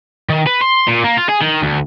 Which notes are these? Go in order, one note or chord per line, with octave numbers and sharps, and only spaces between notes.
D#3
B4
C6
A#2
A#3
F4
G#4
D#3
D2